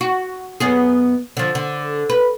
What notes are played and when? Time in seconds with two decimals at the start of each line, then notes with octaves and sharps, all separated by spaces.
0.01 F#4
0.60 F#2 B3 G#4
1.37 D3 F3
1.55 D3
2.10 B4